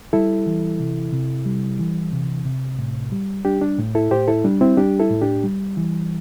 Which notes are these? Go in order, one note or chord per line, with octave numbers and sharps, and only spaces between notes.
G3 E4 A4
E3
C3
C3
G3
E3
C3
C3
A2
G3
G3 D4 G4
D4
A2
E4 A4
A2 G4 C5
E4 A4
G3 D4
C4 E4
G3 D4 G4
E4 A4
A2
D4 G4
G3
E3